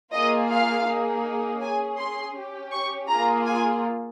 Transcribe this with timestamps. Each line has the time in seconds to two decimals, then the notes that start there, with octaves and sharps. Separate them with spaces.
0.13 A#3 F4 G#4 D#5
0.50 F5
0.87 A#3 D#4 G#4
1.61 C#4 G#4 G#5
1.98 C6
2.35 C#4 G4
2.72 C#6
3.09 A#3 F4 G#4 A#5
3.46 G#5